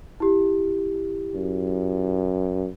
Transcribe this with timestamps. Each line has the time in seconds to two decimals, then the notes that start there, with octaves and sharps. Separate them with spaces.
0.20 E4 G4
1.35 F#2